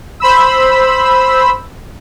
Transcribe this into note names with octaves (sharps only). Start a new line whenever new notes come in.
C5 B5 E6